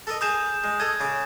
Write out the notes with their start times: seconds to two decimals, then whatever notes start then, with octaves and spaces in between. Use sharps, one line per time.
0.07 A4 A#4 D#5
0.21 G#4 A#4 A#5 D#6 G6 E7
0.64 G#3
0.80 A4 D#5 D#6 G#6
1.00 C#3 D6